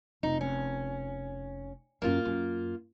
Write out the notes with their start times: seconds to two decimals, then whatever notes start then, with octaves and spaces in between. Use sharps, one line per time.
0.23 F1 D#4
0.41 C#4
2.02 F#2 A#3 E4 F4
2.25 F#2